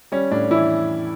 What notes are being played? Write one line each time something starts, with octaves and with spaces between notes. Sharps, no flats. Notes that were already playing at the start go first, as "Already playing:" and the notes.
G3 C#4
A2 D4
E3 E4